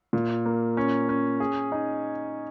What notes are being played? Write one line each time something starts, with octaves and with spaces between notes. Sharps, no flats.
A#2
A#3
C#4
C#4
G#4
D#4